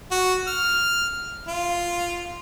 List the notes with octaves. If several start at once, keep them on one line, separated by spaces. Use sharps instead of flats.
F#4
F6
F4